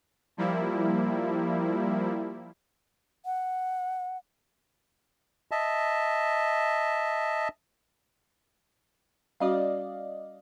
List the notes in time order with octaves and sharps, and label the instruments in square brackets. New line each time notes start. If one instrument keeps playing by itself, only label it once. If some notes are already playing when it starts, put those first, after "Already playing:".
[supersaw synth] F3 G3 A#3 E4
[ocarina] F#5
[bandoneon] D#5 E5 A5
[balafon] G3 C#4 F#4 [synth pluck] D5 D#5 F5